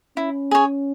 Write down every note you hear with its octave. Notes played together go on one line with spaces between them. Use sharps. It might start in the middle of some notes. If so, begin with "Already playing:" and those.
C#4 E4
G#4 C#5